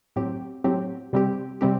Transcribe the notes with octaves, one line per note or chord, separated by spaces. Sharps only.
A2 F#3 C4 G4
A2 F#3 C4 G4
C3 G3 C4 G4
C3 G3 C4 G4